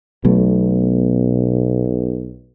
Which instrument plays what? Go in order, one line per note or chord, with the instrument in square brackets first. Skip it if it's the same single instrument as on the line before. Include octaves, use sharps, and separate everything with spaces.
[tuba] B1 [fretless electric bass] B2 F#3 A3